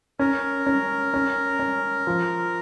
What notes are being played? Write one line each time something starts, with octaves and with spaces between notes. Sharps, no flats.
C#4 A#4
C#4
C#4
C#4
F3